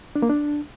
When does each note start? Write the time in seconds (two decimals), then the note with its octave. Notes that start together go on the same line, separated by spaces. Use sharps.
0.16 D4
0.22 A#3
0.29 D4